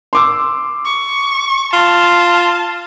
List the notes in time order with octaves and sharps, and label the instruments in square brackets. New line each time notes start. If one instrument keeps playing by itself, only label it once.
[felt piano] C6 D6 E6
[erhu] C#6
[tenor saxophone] F4 [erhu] A5